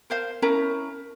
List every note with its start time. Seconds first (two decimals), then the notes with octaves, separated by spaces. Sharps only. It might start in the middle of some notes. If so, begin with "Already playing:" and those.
0.10 A#4 C5 F5
0.42 C#4 E4 A#4 A#5